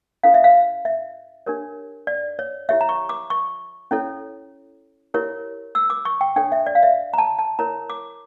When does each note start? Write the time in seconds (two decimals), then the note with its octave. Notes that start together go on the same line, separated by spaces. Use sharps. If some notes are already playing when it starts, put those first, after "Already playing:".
0.23 C#4 E4 A4 F5
0.34 E5
0.44 F5
0.85 E5
1.46 D4 G4 A#4 C#5
2.07 D5
2.39 C#5
2.69 E4 G4 C#5 E5
2.81 A#5
2.89 C#6
3.09 D6
3.30 C#6
3.91 C#4 E4 A4 C#5
5.14 E4 G4 A#4 C#5
5.75 E6
5.90 D6
6.05 C#6
6.21 G5
6.36 D4 A4 C#5 G5
6.52 E5
6.67 D5
6.75 F5
6.83 E5
7.14 A#5
7.18 A5
7.39 A5
7.59 E4 A#4 C#5 A#5
7.90 D6